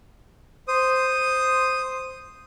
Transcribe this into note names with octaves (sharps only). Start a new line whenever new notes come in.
C5 D#6